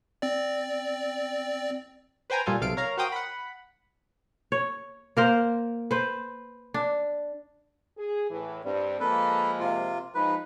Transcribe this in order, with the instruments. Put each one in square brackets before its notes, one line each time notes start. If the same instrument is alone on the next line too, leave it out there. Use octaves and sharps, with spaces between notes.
[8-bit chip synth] C4 D5
[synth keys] B4 C5 G5 G#5 A#5
A#2 G3 F4 A4 G#5
B1 C3 A4 F5 D7
A#4 C#5 F5 A#5
F#4 A#4 C5 F5 G5 D#6
F#5 B5
[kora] C#5
A#3 A#4 C5
B4 C5
D4
[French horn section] G#4
A2 E3
[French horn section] G2 C4 [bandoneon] G3
[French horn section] F3 G#3 A#3 [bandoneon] A4 B4
[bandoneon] C3 F4
[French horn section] F3 G#3 D#4 [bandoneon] B4